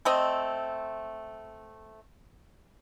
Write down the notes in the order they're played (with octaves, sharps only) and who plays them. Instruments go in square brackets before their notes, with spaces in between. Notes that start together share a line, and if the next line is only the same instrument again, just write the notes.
[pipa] A3 C4 D#5